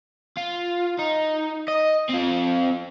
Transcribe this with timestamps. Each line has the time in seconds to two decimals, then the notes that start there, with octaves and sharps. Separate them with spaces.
0.37 F4
0.99 D#4
1.68 D#5
2.09 C4 F4